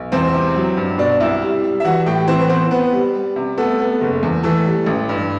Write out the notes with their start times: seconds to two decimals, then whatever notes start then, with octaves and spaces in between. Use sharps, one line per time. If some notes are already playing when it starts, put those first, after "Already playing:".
Already playing: B1
0.12 E2 C4 C5
0.34 C3
0.56 F#3
0.77 G2
0.98 B2 D4 D5
1.20 C2 E4 E5
1.42 G3
1.64 G3
1.80 E5
1.84 E3 F#4 F#5
2.06 A2 G4 G5
2.27 E3 C4 C5
2.40 B4
2.49 B3 C4 C5
2.71 B3 B4
2.92 G3
3.15 G3
3.36 C3
3.57 A3 B3 A4
3.79 B3
4.01 F#1
4.23 E2
4.43 E3 A3 A4
4.66 G3
4.86 A1
5.09 G2